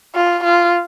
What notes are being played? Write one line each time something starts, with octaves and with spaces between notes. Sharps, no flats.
F4
F4